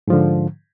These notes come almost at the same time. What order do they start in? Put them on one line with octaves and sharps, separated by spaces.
G#2 F3 D3